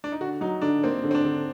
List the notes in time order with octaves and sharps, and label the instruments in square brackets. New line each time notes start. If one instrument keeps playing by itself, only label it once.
[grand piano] D4
D#4
[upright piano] D3 [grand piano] F#4
[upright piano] F#3 [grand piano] D#4
[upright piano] D3 [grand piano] D4
[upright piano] A#3 [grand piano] C4
[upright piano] D3
[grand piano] C4
D4
[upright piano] D3